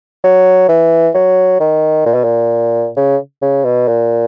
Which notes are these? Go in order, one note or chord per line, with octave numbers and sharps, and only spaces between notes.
F#3
E3
F#3
D#3
A#2
B2
A#2
C#3
C#3
B2
A#2